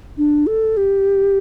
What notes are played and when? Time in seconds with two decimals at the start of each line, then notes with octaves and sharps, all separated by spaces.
0.17 D4
0.47 A4
0.77 G4